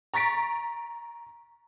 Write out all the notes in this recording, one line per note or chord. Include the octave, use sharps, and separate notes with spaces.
A#5 C#6 A6 B6 D7